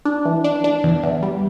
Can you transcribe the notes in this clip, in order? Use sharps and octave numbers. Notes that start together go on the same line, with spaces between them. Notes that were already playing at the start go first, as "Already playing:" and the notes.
D4
E3
D4
D4
E2
E2
G3